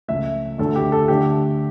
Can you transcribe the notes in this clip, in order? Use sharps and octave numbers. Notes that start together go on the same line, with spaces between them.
C#2 C#3 F3 A3 E5
D2 D3 A3 A4
G4
A4
D3 A3 G4